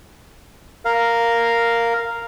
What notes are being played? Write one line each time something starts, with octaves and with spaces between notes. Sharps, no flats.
A#4 F5